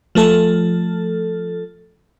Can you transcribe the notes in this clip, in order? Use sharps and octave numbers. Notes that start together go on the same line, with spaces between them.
F3 A3 A4